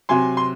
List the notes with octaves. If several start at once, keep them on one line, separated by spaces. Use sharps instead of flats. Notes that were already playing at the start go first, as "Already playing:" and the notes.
C3 F#3 G#5 C6
C6